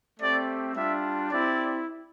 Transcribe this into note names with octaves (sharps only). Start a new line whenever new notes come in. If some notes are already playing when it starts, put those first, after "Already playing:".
A3 C4 G4 D5
G3 D4 F4 E5
C4 E4 G4 D5